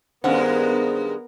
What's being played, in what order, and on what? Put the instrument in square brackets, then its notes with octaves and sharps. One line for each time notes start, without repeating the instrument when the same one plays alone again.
[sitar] G2 D#3 G#3 [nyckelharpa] B3 A#4 [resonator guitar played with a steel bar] C#4 F#5 [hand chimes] C5